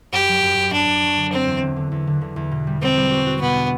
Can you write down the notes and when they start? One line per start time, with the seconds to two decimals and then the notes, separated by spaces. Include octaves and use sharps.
0.12 F#2 G4
0.28 F#3
0.43 F#2
0.57 F#2
0.72 F#2 D4
0.88 F#2
1.03 F#3
1.17 D3
1.32 F#3 C4
1.47 E2
1.62 D3
1.76 D3
1.92 E2
2.07 D3
2.21 D3
2.36 E2
2.51 B2
2.67 G3
2.81 G3 C4
2.97 G3
3.11 F#4
3.26 F#4
3.41 B2 B3
3.56 D4